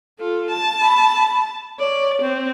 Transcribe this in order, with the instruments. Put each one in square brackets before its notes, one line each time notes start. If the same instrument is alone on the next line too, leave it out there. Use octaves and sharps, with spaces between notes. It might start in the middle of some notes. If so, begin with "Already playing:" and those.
[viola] F4 A4
A5
[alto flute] B5
[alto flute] C#5 [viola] D5
[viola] C4